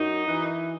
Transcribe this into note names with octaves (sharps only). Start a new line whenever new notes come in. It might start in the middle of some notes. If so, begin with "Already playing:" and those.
Already playing: F#2 D#4
E3